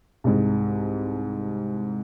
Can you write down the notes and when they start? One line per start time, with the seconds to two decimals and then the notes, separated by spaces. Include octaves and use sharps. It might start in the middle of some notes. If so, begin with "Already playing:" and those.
0.24 C2 G#2